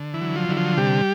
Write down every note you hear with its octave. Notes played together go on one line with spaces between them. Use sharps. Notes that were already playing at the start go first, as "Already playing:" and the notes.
Already playing: D3
E3 E4
F#3
F3 F4
D3 E4
F3 F4
C3 G3 G4